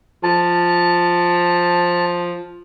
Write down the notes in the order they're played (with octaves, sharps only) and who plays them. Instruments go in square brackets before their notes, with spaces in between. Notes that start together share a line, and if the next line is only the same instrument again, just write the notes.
[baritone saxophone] F3 [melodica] A5